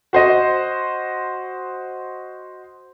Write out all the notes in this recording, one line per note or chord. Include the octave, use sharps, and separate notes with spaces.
F#4 C5 D#5